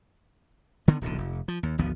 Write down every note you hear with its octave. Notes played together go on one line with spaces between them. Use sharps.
D3 D#3 B3
D1 B1 D3
F1
F3
D#2
G#1 D2 F3 B3